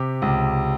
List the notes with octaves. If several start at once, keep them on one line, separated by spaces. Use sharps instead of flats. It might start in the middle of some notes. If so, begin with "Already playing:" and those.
Already playing: C3 G4
C#2